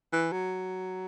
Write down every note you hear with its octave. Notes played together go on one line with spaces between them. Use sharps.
E3
F#3